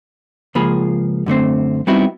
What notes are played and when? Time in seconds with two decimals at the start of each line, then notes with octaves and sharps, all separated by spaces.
0.55 C#2 F3 A#3 F4 G#4 B5
1.26 F#2 D3 A3 C4
1.87 G3 B3 C4 D#4 E4 F#4